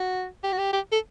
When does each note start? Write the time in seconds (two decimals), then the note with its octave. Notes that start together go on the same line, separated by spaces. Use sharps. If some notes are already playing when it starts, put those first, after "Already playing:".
Already playing: F#4
0.43 G4
0.52 F#4
0.58 G4
0.73 G4
0.92 A4